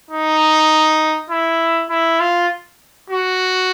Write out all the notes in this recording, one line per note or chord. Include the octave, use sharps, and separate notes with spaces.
D#4
E4
E4
F4
F#4